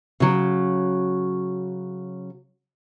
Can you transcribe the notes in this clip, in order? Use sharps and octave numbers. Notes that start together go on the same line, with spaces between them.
C#3 F#3